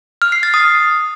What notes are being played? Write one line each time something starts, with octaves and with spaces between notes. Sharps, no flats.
F6
C7
A6
D#6